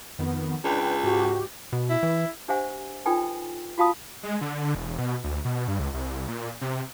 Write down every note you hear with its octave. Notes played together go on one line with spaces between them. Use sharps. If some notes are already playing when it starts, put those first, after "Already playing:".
F2 D#3 B3
C#2 D4 B4 G5
G#2 F#4 G4
B2
E4
E3
D4 G4 C5 E5 F#5 G#5
D#4 F4 A4 B4 G5 G#5
F4 F#4 F5 A5 B5 D#6
G#3
D3
E1
B2
D2
B2
G2
C#2
C2
A#2
C3